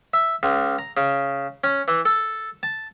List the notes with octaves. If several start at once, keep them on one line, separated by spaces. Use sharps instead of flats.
E5
C#2
A#5
C#3
C#4
E3
A4
A5